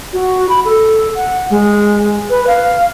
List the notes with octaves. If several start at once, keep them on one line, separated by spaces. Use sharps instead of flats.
F#4
B5
A4
F#5
G#3
B4
F5